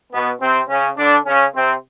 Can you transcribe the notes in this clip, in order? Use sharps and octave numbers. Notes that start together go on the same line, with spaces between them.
B2 B3
C3 C4
C#3 C#4
D3 D4
C#3 C#4
C3 C4